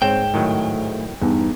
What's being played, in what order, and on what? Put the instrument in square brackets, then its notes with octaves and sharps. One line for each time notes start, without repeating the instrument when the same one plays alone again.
[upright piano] G#2 C#5 E7 [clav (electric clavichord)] C4 [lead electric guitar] G5
[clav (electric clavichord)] A2 D#3 F#3 [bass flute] A3
[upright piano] E2 [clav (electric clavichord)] G2 [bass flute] D#4